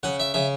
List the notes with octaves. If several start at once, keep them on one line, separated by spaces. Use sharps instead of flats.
C#3 F#5
E5
C#3 E5